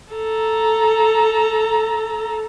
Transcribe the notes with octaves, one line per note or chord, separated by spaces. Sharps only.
A4 A#5